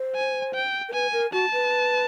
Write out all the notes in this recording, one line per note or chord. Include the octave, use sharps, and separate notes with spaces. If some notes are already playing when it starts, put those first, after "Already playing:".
Already playing: C5
G#5
G5
A#4
B4 G#5
A#4
F#4 A5
B4